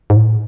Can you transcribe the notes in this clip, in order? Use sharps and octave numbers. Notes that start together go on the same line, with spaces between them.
G#2
A2